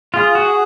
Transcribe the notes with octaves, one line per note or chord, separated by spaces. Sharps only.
F4 G#4
F#4